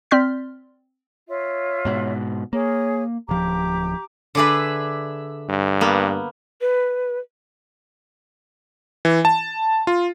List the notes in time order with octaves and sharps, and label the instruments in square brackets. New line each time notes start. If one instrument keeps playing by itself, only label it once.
[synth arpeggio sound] C4 D5 C6 F6 G6 B6
[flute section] F4 C#5 E5
[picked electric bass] G#2 B2
[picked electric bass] A#3 [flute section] G#4 C#5
[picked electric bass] D1 F3 [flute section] G4 A#5 D6
[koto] D3 G#4 B4 [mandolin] D5 E5
[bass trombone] G2
[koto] A#3 B3
[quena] B4
[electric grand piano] E3
A5
F4